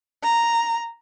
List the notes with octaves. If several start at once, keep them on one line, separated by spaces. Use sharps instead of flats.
A#5